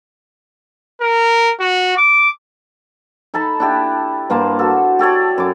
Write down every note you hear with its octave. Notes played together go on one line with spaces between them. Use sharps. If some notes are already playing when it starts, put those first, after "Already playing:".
A#4
F#4
D6
D#4 A4 A5 B5
D4 E4 G4
G2 A#3 C5 A5
F#4 A4
G4 A4 C#5 D5
F#2 D6